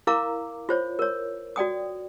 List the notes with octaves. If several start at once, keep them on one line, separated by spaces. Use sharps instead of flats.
E4 A#4 F5 A#5 D6
F4 C5 C#5
A#4 C#5
F#4 D5 G5 D#6